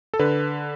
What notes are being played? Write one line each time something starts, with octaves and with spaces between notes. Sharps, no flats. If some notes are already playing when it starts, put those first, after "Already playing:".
A4
D3 B4